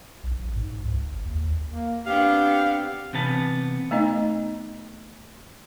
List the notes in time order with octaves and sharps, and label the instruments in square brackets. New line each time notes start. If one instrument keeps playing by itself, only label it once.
[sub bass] B1
A1
G#2
C#2
G1
D#2
[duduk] A#3
[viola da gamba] B3 C4 D4 [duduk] G4 [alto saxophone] F5
[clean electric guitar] C3 E3 B3 B4 A5
[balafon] A3 B3 D#4 D#5